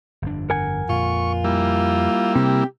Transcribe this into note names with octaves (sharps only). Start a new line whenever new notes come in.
G1 F2 D4
A#4 F#5 G#5
F2 A#2 F4 C#6
G3 A#3 E4
C3 C4 G4